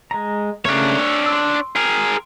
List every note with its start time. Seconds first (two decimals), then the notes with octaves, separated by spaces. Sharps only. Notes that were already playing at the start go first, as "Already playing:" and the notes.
0.11 G#3 A#5
0.65 C#3 A3 A#3 D4 C#5
0.99 E6
1.26 C6 E6
1.76 G#4 A#4